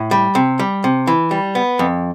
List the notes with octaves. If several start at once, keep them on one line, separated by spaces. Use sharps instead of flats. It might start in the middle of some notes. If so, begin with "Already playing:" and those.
Already playing: A2
G3
C3
G3
C3
E3
G3
B3
F2